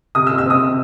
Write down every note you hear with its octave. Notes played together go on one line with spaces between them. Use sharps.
C3 D#6
E6
C3
E6
C4 D#6
C3